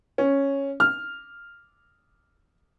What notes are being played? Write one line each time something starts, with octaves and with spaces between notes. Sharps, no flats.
C#4
F6